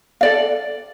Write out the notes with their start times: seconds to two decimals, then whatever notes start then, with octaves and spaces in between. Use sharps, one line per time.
0.21 A4 D5 F5